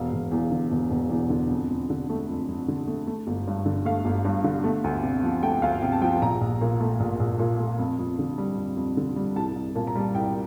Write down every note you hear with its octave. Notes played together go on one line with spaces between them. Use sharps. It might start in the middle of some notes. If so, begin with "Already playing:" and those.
Already playing: E1 F5
E1
E2
D3
E1
E1
E2
D3
F2
F2
D3
A3
F2
F2
D3
A3
A3
G1
G2
D3
A3 F5
G1
G2
D3
A3
D2
C3
F3
A3 G5
D2 F5
C3 G5
A5
F3 G5
A#1 A#5
A#1
A#2
A3
A#1
A#1
A#2
A3
F2
F2
D3
G3
F2
F2
D3
G3
C2 A5
C2
A#2 A5
A#5
G3 A5
C2 G5